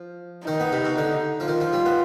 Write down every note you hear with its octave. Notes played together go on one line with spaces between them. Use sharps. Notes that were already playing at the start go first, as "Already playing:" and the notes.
Already playing: F3
D#3 D#4
B3
C3
B2
D3
F3
D#3 F4
F3
G3
B3